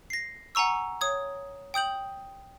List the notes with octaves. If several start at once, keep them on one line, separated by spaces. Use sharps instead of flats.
A#6 C7
F#5 G#5 A#5 C#6 E6
C#5 D#6 G#6
G5 D#6 G6 F#7